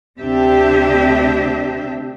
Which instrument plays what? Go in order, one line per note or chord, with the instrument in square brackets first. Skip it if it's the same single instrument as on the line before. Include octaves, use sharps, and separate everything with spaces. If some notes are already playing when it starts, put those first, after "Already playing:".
[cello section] D2 C3 D4 G4 E5